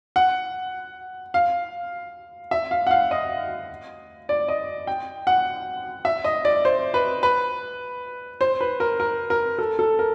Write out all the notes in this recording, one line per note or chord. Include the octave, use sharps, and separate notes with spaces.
F#5
F5
E5
F5
F#5
F5
D#5
D5
D#5
G5
F#5
E5
D#5
D5
C5
B4
B4
C5
B4
A#4
A#4
A#4
A4
A4
A#4